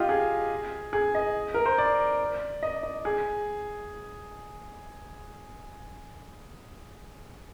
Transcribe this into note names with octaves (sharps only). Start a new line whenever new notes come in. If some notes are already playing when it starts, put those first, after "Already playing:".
Already playing: F4 G4 D#5
G#4
G#4
D#5
A#4
C5
D5
D#5
D#5
G#4